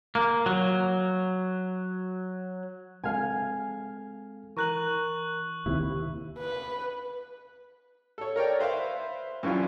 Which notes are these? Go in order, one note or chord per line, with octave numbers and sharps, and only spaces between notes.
A#3
F#3
G#3 C4 A4 F5 G#5
E3 A#4 A#5 C#6 F#6 F#7
D#2 C3 E4
B4
A4 C#5
A#4 C#5 D5 G5
B4 C5 E5 F5
F#2 E3 F3 G3 F4